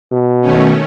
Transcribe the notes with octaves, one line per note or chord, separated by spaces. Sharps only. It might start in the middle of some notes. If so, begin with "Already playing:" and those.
B2
D#3 A3 C#4